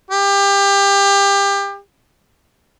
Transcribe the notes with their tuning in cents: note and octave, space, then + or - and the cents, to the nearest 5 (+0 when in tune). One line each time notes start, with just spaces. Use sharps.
G4 +25